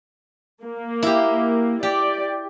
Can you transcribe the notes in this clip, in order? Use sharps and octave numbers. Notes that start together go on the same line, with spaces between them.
A#3
E4 G4
G4 D5